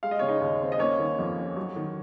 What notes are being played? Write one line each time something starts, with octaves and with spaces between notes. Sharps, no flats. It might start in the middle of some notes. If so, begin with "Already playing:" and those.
G#3 F5
D#5
C#3 C#5
D#4 D#5
D#2
C4
D#5
A#3 C#4 C#5
D#3
F2
C#4
F#3
D#3